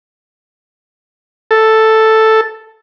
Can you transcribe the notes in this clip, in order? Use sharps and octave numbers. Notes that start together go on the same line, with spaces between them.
A4